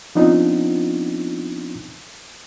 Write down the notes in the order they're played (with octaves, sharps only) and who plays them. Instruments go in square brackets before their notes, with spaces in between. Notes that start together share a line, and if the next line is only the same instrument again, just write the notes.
[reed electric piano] F3 B3 C4 D4 D#4 F4